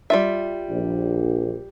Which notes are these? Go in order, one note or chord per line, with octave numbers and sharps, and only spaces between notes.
G3 F4 E5
A#1